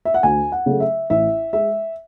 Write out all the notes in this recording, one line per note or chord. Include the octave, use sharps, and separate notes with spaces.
E5
F#5
D2 G#5
F#5
C#3 F#3 A3
E5
A1 E5
G#3 E5